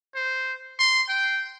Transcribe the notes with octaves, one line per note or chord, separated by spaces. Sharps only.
C5
C6
G5